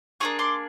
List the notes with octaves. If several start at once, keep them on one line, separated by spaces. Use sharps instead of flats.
A#3 D4 F4 G#4 C#6 D#6
C6 D6